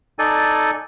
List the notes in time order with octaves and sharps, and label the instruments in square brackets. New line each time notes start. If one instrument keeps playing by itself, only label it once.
[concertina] D#4 A4 D5 G#5